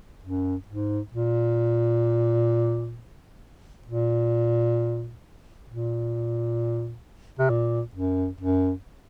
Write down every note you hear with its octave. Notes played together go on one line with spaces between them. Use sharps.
F#2
G#2
A#2
A#2
A#2
C3
A#2
F#2
F#2